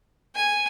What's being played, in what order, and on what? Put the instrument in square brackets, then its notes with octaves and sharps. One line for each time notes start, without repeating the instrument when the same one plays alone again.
[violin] G#5